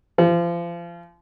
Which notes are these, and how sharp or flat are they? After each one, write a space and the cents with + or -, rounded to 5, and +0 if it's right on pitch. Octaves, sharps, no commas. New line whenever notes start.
F3 -30